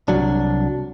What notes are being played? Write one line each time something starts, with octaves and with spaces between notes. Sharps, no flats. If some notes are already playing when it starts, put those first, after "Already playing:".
C2 F#3 D4